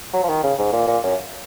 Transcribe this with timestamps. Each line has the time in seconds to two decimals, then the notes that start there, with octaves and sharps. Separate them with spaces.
0.13 F#3
0.23 F3
0.28 D#3
0.43 C#3
0.58 G#2
0.72 A#2
0.87 A#2
1.03 F#2